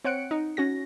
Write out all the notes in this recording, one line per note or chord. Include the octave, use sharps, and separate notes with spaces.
C4 C#5 F#5 F#6 C#7 D7
D#4
C#4 F#4 A#6